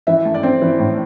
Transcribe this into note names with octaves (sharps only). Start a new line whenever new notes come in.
E3 E5
A3
D5
C4
E3
A2